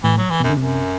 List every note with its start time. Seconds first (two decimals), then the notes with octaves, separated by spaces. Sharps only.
0.04 A2 E3
0.17 F#3
0.30 E3
0.40 F#2 B2
0.50 D3
0.57 F#2 C3